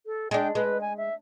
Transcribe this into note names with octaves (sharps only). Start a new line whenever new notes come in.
A4
G#3 D4 G5
G#3 B4
G#5
E5